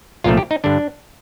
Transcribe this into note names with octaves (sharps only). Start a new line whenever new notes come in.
C2 A#2 F3 A3 F4
G4
D#4
G2 D3 D4